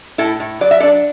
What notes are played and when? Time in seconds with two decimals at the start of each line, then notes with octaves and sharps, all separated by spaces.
0.18 A2 E4 A4
0.40 A2
0.61 F#3 D5
0.71 E5
0.80 D4 A4 D5